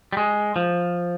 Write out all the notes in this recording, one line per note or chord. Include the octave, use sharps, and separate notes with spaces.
G3
G#3
F3